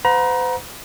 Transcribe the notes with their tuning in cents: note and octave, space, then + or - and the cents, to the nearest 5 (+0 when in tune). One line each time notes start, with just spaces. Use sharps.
C5 -45 F#5 -40 A#5 +30